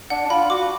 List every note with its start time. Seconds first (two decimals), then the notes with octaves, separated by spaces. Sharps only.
0.10 D4 F#5
0.26 D4
0.30 F4 B5
0.50 F#4 D6